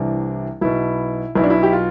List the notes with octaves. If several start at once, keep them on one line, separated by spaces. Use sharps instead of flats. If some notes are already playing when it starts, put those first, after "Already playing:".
Already playing: C2 C3 E3 D4
B1 B2 E4
B1 B2 E4
D4
E4
G4
F4